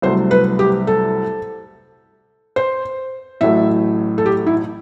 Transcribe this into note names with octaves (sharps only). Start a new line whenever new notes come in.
C2 C3 F#3 A3 C5
B4
G4
A4
C5
A1 A2 F#3 A3 E5
A4
G4
E4